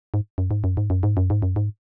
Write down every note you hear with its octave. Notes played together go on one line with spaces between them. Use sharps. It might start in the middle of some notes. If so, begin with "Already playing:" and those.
G#2
F#2
G#2
F#2
G#2
F#2
G#2
F#2
G#2
F#2
G#2